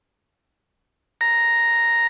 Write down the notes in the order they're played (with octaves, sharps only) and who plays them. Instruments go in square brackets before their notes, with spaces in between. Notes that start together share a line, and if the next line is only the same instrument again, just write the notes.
[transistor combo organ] A#5